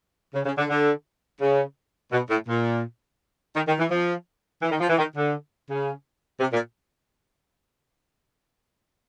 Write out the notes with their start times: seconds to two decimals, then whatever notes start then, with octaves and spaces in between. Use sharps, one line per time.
0.34 C#3
0.46 C#3
0.58 D3
0.69 D3
1.40 C#3
2.12 B2
2.30 A2
2.48 A#2
3.55 D#3
3.67 D#3
3.79 E3
3.91 F3
4.62 E3
4.71 D#3
4.80 F3
4.89 E3
4.98 D#3
5.16 D3
5.69 C#3
6.40 C3
6.53 A#2